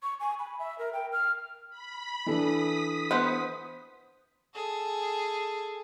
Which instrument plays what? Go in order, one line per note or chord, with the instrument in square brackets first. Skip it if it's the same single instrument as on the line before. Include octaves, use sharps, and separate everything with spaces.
[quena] C#6
G#5
B5
E5
A#4
G5
F6
[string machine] B5
[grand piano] E3 D4 A4 [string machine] D#6 B6
[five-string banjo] B3 B4 C5
[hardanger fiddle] G#4 A4